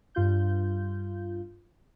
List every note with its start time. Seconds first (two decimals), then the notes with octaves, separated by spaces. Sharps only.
0.15 G2 F4 G6